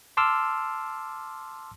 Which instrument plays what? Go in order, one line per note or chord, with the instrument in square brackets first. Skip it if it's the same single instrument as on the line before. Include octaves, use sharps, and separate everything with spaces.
[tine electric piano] A5 C6 D6 E6 F6